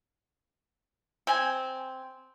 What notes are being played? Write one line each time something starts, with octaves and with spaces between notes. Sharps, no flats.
C4 G#5